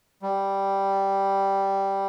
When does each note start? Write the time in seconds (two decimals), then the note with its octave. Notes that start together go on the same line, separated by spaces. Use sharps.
0.22 G3